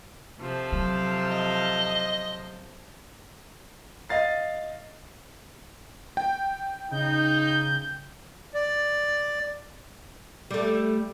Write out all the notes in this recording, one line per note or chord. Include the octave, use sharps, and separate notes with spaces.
C3 F3 A4
F#3
D#5
D#5 F5 A6 C7
G5
C#3 D#4 G6
D5
G3 A3